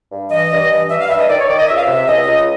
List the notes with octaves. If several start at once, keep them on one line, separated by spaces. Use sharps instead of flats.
G2
E3 D#5
G2
E3
G2 E5
F5
G2 E5
D#5
D#3 D5
C#5
D#3 D5
D#5
C#2 E5
F5
C3 E5
C#2 D#5
C#2